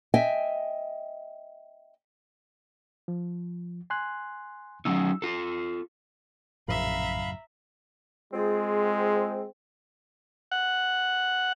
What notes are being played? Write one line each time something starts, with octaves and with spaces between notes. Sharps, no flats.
D#5 E5 G5 G#5
F3
G#5 C6 F#6
F#3 C#4 D#4 E6
F4 A4
A#1 F#2 A2 C#3 E5 F5 A#5 B5
G#3 C4 F4 G#4
F#5